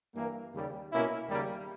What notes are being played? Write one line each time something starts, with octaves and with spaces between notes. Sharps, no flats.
G2 E3 A#3
D#2 C#3 G3
B2 A#3 C#4 E4
D#2 C#3 G3 A#3